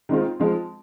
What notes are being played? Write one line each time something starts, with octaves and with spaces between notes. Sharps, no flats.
D#3 G#3 C4 F4
F3 G#3 C4 F4